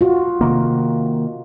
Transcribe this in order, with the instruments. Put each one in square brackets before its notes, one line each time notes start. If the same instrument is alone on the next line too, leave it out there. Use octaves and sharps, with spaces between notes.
[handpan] F4 F#4
[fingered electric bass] C3 D#3 A#3